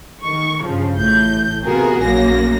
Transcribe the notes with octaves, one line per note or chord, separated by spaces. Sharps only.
D#3 C#6
G2 C#3 F3
A1 A2 G6
C3 B3 F4 F#4 G#4 A#4
A#1 F#2 A#3 A#6